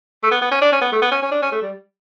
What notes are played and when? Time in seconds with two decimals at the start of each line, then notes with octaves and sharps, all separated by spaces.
0.23 A3
0.31 B3
0.42 B3
0.52 C#4
0.62 D4
0.72 C#4
0.81 B3
0.92 A3
1.02 B3
1.12 C#4
1.22 C#4
1.31 D4
1.42 C#4
1.52 A3
1.62 G3